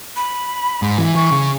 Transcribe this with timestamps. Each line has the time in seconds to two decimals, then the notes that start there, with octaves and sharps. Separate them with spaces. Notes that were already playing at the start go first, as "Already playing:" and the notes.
0.16 B5
0.82 G#2
0.98 E3
1.15 E3 C#6
1.32 C#3